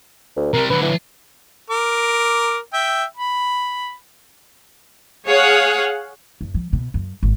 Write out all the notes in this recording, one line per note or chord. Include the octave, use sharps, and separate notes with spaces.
D2
C3 G3 A#4
D3 F#3 B4
E3
A#4 D6
E5 G5
B5
G#4 C#5 F5 F#5
F#2
F3
B2
F#2
G#1